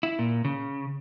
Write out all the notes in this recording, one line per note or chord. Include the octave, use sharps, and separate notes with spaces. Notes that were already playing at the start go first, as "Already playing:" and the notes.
E4
A#2
C#3